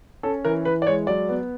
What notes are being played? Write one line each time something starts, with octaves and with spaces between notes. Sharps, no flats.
C#4 A4
E3 A#4
E3 B4
D5
G#3 C#5
F#3 D5
B3